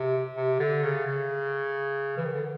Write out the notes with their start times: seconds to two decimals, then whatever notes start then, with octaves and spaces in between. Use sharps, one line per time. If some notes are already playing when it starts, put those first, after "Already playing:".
Already playing: C3
0.36 C3
0.59 D3
0.83 C#3
1.07 C#3
2.17 E3
2.25 D#3
2.33 D3